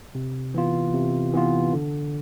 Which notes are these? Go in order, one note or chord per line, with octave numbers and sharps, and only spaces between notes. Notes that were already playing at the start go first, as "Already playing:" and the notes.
C3
E3 B3 F4
C3
E3 B3 F4
D3